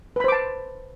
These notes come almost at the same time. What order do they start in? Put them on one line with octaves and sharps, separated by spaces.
B4 B5 C5 D6 A5